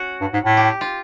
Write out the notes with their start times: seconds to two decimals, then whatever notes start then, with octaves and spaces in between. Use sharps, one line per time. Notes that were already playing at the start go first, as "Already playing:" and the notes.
Already playing: C#4 F#4
0.21 G2
0.33 G#2
0.45 A2
0.57 G4
0.81 F4